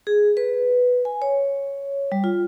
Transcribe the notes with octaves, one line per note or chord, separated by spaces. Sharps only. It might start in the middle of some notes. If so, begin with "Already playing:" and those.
G#4
B4
G#5
C#5
G3
F4